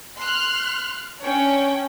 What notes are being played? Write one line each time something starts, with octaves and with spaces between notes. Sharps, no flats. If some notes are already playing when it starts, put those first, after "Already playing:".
C6 F6 F#6
C#4 D4 C#5 G5